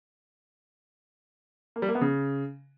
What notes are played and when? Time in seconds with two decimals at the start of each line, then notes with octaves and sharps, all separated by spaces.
1.76 A#3
1.82 G3
1.89 A#3
1.95 B3
2.01 C#3